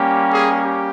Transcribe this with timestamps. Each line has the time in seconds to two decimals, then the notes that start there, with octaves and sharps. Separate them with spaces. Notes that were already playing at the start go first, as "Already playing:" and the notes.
Already playing: G3 A#3 C#4 G4
0.33 G#4
0.62 G4